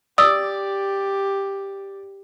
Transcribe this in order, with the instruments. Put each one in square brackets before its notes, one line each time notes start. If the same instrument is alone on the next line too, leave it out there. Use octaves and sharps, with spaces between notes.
[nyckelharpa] G4 [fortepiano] D5 [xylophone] D#6 E6